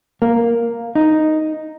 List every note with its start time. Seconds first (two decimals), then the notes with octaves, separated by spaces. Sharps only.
0.22 A#3
0.95 D#4